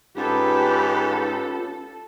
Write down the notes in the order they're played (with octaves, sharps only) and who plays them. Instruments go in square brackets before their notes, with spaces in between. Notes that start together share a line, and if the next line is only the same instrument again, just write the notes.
[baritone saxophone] G#2 [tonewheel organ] C#4 F4 [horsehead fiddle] G4 B4 [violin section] A4